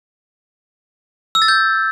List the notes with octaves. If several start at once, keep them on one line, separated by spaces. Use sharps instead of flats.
E6
A6
G6